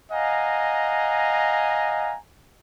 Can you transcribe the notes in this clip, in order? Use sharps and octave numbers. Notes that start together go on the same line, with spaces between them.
D#5 F5 F#5 G#5 A#5